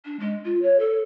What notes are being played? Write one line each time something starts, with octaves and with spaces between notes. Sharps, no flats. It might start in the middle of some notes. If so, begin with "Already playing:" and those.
D4
G#3
F4
C#5
A4